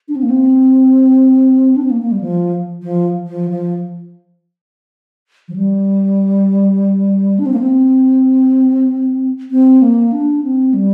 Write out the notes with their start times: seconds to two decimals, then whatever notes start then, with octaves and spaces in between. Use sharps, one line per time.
0.08 D4
0.16 C4
0.22 A#3
0.30 C4
1.76 D4
1.83 C4
1.90 A#3
2.02 A#3
2.12 G3
2.21 F3
2.83 F3
3.27 F3
3.50 F3
5.48 F3
5.56 G3
7.39 D4
7.46 C4
7.53 A#3
7.60 C4
9.51 C4
9.82 A#3
10.12 D4
10.43 C4
10.74 G3